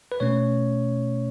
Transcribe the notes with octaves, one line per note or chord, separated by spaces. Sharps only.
B4
B2 A3 C#4 C#5